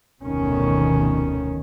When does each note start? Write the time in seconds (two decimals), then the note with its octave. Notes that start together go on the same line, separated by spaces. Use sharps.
0.23 F1 D2 B2 D#3 C#4